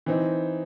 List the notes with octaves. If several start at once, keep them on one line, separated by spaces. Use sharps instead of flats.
E3 C4 D#4